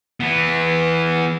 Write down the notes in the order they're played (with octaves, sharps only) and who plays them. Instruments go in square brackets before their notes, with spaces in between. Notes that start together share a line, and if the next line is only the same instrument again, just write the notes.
[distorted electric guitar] E3 B3